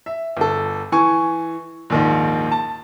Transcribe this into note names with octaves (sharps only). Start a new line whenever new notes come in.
E5
G1 A4
E3 G#5 C#6
A#1 D#2 G#2
A5